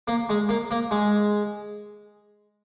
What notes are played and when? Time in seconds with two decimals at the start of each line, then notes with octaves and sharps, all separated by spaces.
0.08 A#3
0.29 G#3
0.49 A#3
0.71 A#3
0.91 G#3